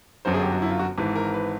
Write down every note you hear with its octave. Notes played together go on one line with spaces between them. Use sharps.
G1 F#2 D3 F#3 C5
G#4
G4
F#4
E4
F4
F#4
G#1 G#2 E3 B4
A#4
B4